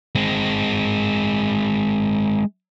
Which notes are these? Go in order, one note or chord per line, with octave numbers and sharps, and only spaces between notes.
G#3 C4